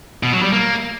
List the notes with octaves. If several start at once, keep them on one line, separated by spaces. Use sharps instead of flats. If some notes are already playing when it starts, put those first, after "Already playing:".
B2
F#3
G3
A#3